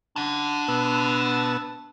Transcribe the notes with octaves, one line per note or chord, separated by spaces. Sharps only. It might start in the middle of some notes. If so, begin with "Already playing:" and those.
D4 F#5 A5
B2 B3 E6